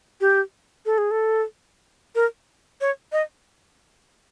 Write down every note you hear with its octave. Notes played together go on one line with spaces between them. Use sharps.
G4
A4
G#4
A4
A#4
C#5
D#5